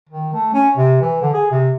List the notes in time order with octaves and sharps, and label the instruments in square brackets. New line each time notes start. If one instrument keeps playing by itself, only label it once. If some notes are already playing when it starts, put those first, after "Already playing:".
[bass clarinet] D#3
A3
C#4
C3
E3
D3
G#4
C3